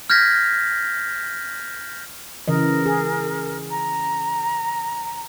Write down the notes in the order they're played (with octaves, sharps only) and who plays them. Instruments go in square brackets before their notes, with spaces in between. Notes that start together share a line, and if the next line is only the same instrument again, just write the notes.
[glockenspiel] F6 G6 G#6 A#6 B6
[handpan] C#3 E3 D#5 [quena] A#4
[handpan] G#4
[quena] A#5